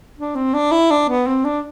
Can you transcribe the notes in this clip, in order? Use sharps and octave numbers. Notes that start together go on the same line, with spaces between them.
D4
C4
D4
E4
D4
B3
C4
D4